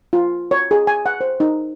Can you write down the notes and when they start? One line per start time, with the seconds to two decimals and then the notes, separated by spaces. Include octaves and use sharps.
0.13 F4
0.51 C#5
0.71 G#4
0.87 G#5
1.06 F#5
1.21 C5
1.40 D#4